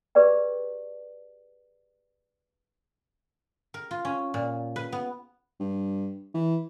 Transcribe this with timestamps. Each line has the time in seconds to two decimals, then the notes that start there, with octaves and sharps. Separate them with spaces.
0.15 G4 G#4 B4 D5 G5
3.74 A#4
3.91 F4
4.05 C#4
4.34 A#2
4.76 B4
4.92 B3
5.60 G2
6.34 E3